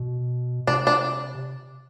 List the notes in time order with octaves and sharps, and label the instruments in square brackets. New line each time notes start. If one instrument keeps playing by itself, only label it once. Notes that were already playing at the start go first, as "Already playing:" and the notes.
Already playing: [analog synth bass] B2
[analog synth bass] C3 [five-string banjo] D4
[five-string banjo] D4